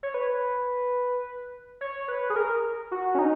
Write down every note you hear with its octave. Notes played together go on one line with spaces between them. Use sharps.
C#5
B4
C#5
B4
G#4
A#4
F#4
C#4
D#4